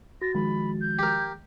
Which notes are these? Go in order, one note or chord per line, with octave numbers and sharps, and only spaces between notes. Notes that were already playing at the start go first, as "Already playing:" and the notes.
F#4 A6 A#6
D#3 F3 G#3 B5
G6
G4 A#4